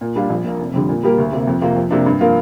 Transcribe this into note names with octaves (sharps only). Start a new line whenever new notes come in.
A#2
G3 D4 F4
A#1
A#2 A#3
F1
F2 D3 G3
A#2
G3 A#3 G4 A#4
D2
C3 A#3
F2
C3 A#3 F4
F2
C3 A#3 D4
G2
F3 A#3 F4 A#4